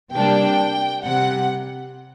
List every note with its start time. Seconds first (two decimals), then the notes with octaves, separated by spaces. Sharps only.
0.13 C3 G3 A#3 D4 G5
1.05 C3 G3 F#5